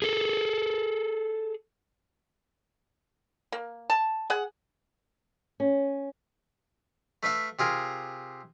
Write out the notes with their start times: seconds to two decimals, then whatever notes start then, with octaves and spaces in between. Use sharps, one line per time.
0.02 G#4 A4
3.52 A#3
3.90 A5
4.30 G#4 F#5
5.60 C#4
7.23 A3 B4 E5 F5
7.59 C3 F4 G#4 A#4